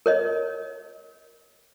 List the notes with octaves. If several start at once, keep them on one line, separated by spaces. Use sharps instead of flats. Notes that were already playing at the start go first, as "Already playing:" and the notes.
A#4 C#5 D#5